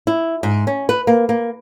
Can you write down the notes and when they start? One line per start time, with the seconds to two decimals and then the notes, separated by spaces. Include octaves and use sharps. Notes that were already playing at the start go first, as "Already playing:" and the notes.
0.07 E4
0.43 G#2
0.67 C#4
0.89 B4
1.07 A#3
1.29 A#3